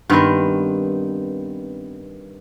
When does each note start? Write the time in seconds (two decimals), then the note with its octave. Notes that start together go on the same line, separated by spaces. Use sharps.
0.10 G2 D#3 B3 C4